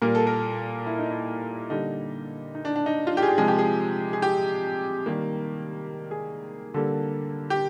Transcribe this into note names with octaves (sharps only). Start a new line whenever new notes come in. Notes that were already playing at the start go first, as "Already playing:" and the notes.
A#2 G3 A#3 A#4
A4
A#4
E4
D#4
E4
D3 G3 A#3 D#4
D#4
D4
D4
D#4
F4
G4
G#4
G4
C3 F3 G#3 G#4
G4
G#4
G#4
G4
D#3 G3 A#3
G#4
D3 G3 A#3 A4
G4